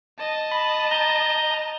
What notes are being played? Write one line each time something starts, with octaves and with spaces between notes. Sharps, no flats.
D#5 A5
B5
A#5 G6